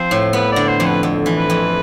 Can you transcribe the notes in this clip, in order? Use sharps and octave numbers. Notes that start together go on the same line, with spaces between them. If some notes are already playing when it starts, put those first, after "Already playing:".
Already playing: F3 C4 C5
A2
B3 B4
D3 D5
C5
F2
B4
F2
E3
B4
F2